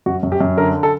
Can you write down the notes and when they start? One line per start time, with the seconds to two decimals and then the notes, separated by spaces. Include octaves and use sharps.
0.06 F#2 F#4
0.23 F#2
0.32 G4
0.41 F#2
0.57 D3 A#4
0.83 A4